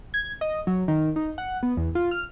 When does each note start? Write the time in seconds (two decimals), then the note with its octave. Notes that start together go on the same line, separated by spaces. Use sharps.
0.14 G#6
0.41 D#5
0.67 F#3
0.88 D#3
1.16 D#4
1.38 F#5
1.63 B3
1.77 E2
1.95 F4
2.11 F6